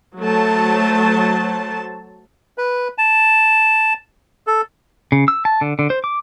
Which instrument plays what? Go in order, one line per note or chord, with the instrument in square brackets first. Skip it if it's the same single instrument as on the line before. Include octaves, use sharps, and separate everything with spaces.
[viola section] F#3 A3 C5 A5
[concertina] B4
A5
A4
[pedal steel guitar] C#3
E6
A5
D3
D3
C5
D6